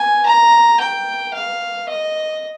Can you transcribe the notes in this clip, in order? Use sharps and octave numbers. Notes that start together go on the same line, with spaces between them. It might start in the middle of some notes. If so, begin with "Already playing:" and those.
Already playing: G#5
A#5
G5
F5
D#5